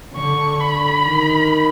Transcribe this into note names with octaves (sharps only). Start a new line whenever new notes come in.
D3 C#6
B5
D#3